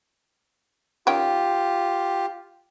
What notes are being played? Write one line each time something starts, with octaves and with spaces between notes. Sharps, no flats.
D#3 C#4 F4 G4 G5